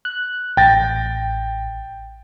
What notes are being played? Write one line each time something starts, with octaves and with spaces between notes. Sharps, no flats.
F#6
A1 G5 A6 A#6